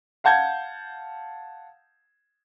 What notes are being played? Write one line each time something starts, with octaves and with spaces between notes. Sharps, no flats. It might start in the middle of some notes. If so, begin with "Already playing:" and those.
F5 F#5 A5 G6 G#6